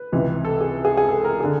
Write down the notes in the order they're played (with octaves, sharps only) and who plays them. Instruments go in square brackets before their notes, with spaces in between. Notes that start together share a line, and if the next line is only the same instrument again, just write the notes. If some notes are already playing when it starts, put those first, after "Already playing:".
Already playing: [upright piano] B4
C#2 C3 E3
A4
G#4
G#4
G#4
A4
A#4
D3 G#4